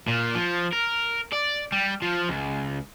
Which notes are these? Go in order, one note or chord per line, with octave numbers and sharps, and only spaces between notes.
A#2
F3
A#4
D5
G3
F3
C#2